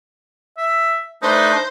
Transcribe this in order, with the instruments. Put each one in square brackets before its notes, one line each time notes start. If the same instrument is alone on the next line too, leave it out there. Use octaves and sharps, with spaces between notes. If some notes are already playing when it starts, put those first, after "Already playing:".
[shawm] E5
[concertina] A3 D4 B4 [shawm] D#4 [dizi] C5